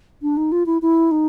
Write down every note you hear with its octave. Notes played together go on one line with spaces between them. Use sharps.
D4
D#4
F4
E4
E4
D#4